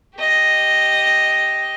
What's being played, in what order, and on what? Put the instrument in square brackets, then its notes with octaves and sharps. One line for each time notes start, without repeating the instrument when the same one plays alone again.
[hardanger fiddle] G4 D#5